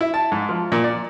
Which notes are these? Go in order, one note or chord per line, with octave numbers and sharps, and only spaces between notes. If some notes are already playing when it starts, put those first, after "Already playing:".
E4
A5
G#2
F3
A#2
D5